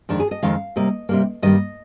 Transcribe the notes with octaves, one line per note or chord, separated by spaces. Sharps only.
F2 D#3 G#3 D4
G#4
D#5
F2 D#3 G#3 F5
C3 G3 A#3 D#5
C3 G3 A#3
G2 D#3 G3 A#3 D#5